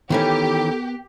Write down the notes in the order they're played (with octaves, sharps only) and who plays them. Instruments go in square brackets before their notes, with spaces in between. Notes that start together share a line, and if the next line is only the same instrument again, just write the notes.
[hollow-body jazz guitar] D#3 E3 C#4 [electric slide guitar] B3 A#4 [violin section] G4 [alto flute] A4